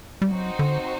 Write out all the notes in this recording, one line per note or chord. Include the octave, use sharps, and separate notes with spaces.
G3
F#3 C4 D#4 F#4 C5
D3